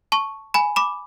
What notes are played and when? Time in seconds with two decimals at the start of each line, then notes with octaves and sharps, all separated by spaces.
0.12 A5 C#6
0.54 G#5 B5
0.76 B5 D6